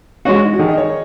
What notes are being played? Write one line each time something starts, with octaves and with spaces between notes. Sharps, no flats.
G#3 C#4 F#4
D#4
F#4
D#3 G#4
D#5
C#5